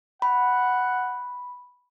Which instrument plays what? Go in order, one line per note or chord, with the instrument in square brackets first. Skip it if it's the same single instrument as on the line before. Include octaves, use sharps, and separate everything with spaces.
[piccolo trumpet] F#5 [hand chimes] B5